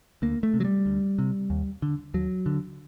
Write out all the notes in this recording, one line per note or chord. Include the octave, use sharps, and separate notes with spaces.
D2 A#3
A3
C3
F#3
G3
D2
C3
D#2
D3
D#2 F#3
D3